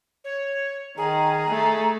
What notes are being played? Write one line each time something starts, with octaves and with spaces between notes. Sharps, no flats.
C#5
D#3 G#4 A#5
A3